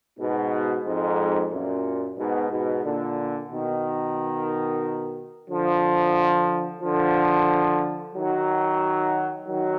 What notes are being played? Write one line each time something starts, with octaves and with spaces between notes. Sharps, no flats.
G#2 B2
F2 G#2
F#2 A#2
G#2 B2
G#2 B2
A#2 D3
B2 D#3
D3 F3
D3 F3
D#3 F#3
D#3 F#3